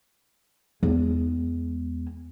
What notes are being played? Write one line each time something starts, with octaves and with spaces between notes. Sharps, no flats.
E2 G#3